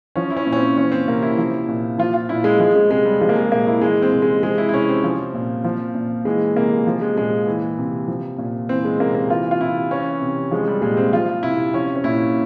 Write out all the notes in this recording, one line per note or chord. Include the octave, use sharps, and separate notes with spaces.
F3 C#4
E4
C#4
A#2
C#4
C4
E3 C#4
C4
C3 A#3
E4
F3
A#2
F3 F4
F4
A#2 E4
G#3
F3 G#3
G#3
C3 G#3
G3
F3 G#3
A#3
G#3
A#2 A#3
E4
E3 G#3
C4
C3
G#3
F3 G#3
E4
E4
C3 C#4
C4
F3
A#2
F3
A#2
E3 G#3
C3 A#3
F3
G#3
A#2 G#3
E3
C3
F3
A#2
E3 C4
G#3
C3 A#3
A#3
E3 F4
F4
C3 E4
E3 C#4
C3
F3 G#3
G3
A#2 G#3
C4
F3 F4
C3 E4
F3 C#4
C#4
A#2 E4